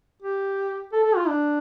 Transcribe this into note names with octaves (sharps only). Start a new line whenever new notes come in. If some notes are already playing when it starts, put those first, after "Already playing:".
G4
A4
A4
F4
D4